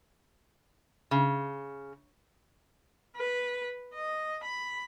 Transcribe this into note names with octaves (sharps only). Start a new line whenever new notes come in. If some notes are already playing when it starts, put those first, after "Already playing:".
C#3
B4
D#5
B5